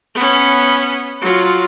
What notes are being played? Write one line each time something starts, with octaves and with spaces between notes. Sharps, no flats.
B3 C#4
F#3 F4